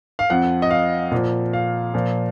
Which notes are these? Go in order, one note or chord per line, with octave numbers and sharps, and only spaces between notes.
F5
F2 F3 F#5
D#5
F5
A#2 F3
F5
A#2 F3